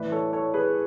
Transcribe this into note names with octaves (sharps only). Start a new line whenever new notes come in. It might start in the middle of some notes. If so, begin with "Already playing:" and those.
Already playing: A2 E3 B4 D5
A4 C#5
A4 C#5
G#4 B4